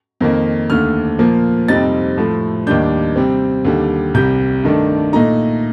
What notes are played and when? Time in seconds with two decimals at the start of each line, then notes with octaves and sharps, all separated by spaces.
0.21 F2 D#3 A#3
0.70 D#2 D3 A3 F6
1.19 A#2 F3 A#3
1.68 F2 C3 G3 C4 D#4 A6
2.18 A2 F3 A3
2.67 D#2 D#3 G3 D4 G6
3.16 C3 G3 C4
3.65 D#2 D3 G3
4.14 C2 C3 G3 G6
4.64 G2 D#3 A3 D4
5.13 A#2 A3 D#4 A#5